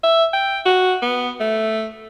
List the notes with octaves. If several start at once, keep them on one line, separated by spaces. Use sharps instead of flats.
E5
G5
F#4
B3
A3